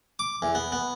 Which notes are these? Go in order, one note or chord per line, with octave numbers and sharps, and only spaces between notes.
D6
E2
B3
B3